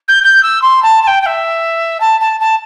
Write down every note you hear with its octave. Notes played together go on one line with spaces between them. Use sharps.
G6
G6
E6
C6
A5
A5
G5
G5
E5
A5
A5
A5